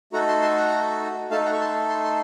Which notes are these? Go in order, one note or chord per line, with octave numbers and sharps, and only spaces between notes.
A3 D#4 F#4 A4 F#5 A#5
A5 C6
A5 C6
F#5 A#5
A3 D#4 A4 F5 A5
F#5 A#5
C#6
A5 C6
A5 C6
A5 C6